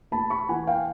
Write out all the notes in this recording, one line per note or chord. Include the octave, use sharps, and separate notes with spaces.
A3 A5 B5
B5 C#6
E3 F#5 G#5
F5 G5